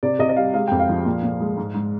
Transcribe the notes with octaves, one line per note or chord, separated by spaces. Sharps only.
C3 D5
C3 D#5
D#5
G3 F5
G#3 F5
F2 G5
F5
F3
A#2
A#2
G#3
G#2
G#2